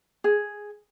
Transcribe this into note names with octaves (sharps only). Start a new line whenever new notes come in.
G#4